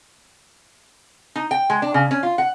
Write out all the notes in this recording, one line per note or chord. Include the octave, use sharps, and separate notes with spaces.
D#4
G5
G#3
D4
C#3
C#4
F4
F#5